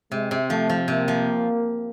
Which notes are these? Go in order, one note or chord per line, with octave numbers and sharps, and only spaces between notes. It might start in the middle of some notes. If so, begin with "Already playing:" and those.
C3 G#3
C3
F3 A3
F3
C3 A#3
F3